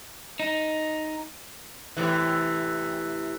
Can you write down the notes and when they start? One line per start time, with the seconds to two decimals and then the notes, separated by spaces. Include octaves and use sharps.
0.40 D#4
1.97 A2 C3 E3